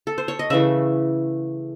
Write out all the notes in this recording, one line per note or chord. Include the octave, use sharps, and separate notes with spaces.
A4
C5
C#5
D#5
C#3 E3 A3 E5